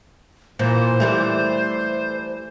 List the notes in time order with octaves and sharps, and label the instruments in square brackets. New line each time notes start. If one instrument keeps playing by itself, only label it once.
[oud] A#2 E3 [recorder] C5
[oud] E3 G3 A3